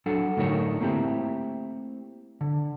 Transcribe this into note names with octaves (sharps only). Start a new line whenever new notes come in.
F#3 D4 A4 F#5
A2 D3 A3 D#4 A#4 C#5
A3 A#3 C4 E4 G4
D3